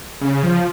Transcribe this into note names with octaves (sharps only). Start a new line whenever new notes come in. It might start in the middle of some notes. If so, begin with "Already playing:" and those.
C#3
F3